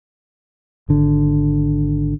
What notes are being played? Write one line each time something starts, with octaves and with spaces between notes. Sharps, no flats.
G#1 D3